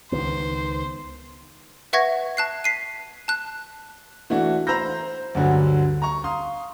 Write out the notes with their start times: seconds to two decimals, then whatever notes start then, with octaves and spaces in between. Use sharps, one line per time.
0.12 C#2 D#3 B3 C5
1.93 B4 E5 F#5 C#6 G#6 A#6
2.37 A5 F#6 C7
2.64 B6 C7 D#7
3.28 A5 F#6
4.30 E3 A3 D4 F#4
4.67 C5 A#5 B5 E6 G6 A#6
5.35 D2 G2 D3 F#3
6.02 A#5 C#6
6.24 F5 C6 D#6